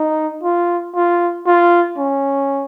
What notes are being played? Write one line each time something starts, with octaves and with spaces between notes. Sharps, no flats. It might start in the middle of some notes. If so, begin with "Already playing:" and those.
Already playing: D#4
F4
F4
F4
C#4